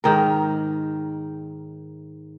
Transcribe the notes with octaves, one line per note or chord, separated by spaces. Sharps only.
G#2 D#3 A#4